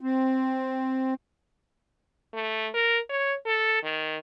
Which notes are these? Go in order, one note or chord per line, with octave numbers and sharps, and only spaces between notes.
C4
A3
A#4
C#5
A4
D#3